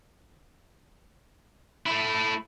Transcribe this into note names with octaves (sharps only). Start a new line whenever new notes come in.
A3 E4